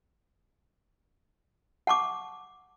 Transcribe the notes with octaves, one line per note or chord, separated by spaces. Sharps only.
F#5 A5 C#6 D6